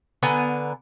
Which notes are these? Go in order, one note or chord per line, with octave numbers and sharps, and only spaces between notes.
D3 B3 G#5 A#5